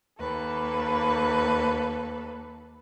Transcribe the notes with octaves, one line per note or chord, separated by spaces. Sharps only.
D#2 A#3 A4 B4